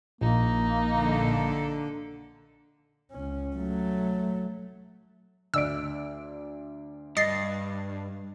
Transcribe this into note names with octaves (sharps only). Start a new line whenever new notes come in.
A#1 A#3 D#4
D3 A4
C#2 C#4
F#3 A3
D2 D5 E6 D7
G2 D#5 A6 C7